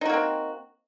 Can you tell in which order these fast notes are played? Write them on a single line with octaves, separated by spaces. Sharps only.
D#4 F#4 A#3 C4